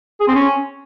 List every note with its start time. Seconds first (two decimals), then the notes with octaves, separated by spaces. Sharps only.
0.20 G#4
0.27 C4
0.34 C#4